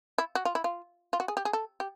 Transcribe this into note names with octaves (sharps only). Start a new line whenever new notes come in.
E4
F#4
F4
E4
F4
F4
F#4
G#4
G4
G#4
A4
G4